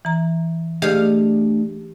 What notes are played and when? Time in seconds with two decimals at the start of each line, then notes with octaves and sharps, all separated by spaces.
0.05 E3 A#5
0.82 D2 G4 G#4 D#5 F5